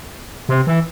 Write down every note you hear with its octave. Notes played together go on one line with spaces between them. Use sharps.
C3
E3